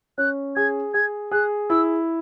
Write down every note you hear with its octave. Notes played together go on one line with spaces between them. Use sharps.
C#4 F#6
G#4 G#6
G#4 G#6
G#4 F#6
E4 E6